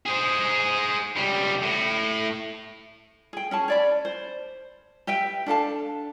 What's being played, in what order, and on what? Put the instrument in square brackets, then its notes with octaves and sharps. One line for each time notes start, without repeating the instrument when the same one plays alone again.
[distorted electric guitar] G#4 C5
C#2 G3
A2
[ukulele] G#4 G5
C#4 G#4 A5
C#5 D5 B5
C5
G4 B4 E5 G5
D4 A4 F5 A5